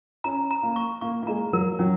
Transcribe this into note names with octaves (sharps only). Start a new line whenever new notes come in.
C#4 A#5
A#5
A#3
C#6
A#3 C#6
A#3
G#3 A#5
F#3 A#4
F#3 C#4